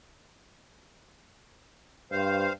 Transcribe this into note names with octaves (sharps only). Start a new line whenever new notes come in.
G2 C5 F5